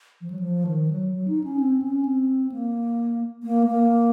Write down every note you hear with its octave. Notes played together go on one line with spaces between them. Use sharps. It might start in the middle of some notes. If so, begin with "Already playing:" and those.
F3
F#3
F3
D#3
F#3
F#3
D#4
C#4
C4
C#4
C4
A#3
A#3
A#3